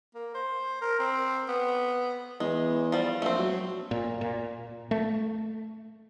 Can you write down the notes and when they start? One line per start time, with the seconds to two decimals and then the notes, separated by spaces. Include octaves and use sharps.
0.15 A#3
0.35 C5
0.81 A#4
0.99 C4
1.49 B3
2.40 E2 G#3
2.92 F3 G3
3.22 A#1 A3 C4
3.39 F#3
3.91 A#2
4.21 A#2
4.91 A3